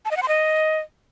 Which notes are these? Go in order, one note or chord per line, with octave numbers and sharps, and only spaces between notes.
A5
D#5
F#5
C6
D#5